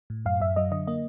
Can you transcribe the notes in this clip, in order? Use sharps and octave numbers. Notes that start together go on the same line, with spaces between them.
A2
F#2 F5
F#2 E5
F#3 D#5
D3 D#5
A#3 D#5